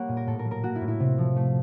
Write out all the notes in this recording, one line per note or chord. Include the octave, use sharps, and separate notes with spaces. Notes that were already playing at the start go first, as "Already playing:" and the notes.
Already playing: G3 A#3 C#5 F#5
A#2
A#4
A2 A4
A#4
F#3
A#4
A#3 F#4
E4
A2
E4
C3
F3
A3